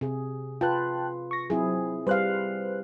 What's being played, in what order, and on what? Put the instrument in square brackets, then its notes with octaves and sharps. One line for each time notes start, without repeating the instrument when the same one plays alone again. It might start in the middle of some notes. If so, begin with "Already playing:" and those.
[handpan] C3 G#4
[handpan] F4 B4 [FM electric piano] G5 A5 F#6
[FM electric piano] C#6 A#6
[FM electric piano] F#3 [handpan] C4 E4 G#4
[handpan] G3 F5 [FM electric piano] B4 C5 F#6